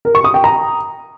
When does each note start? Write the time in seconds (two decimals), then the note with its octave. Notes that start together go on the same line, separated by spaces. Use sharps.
0.05 A#4
0.15 C#6
0.24 D#6
0.34 G5
0.44 A#5